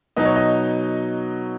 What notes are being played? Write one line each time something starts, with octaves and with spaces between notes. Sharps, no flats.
B2 F#3 D#4 D#5
C#5
D#5